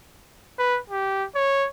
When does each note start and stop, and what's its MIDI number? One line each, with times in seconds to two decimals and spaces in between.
0.59 0.80 71
0.90 1.25 67
1.35 1.68 73